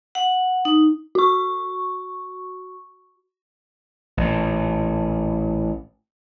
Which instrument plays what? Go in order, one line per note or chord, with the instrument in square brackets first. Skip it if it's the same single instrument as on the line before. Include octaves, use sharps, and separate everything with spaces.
[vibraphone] F#5
D#4
[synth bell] F#4 C#6
[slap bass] A1 A#2